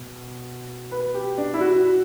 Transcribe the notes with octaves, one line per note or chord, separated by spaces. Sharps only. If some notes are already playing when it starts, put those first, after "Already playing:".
Already playing: B2
B4
G4
D4
E4
F#4